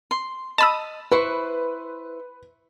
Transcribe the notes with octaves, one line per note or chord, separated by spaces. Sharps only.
C6
D#5 A5 B5 D#6 E6
E4 B4 C5 C#6